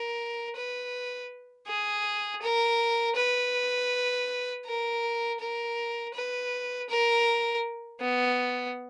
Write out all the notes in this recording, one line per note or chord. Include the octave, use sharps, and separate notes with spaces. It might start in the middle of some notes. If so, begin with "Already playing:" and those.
Already playing: A#4
B4
G#4
A#4
B4
A#4
A#4
B4
A#4
B3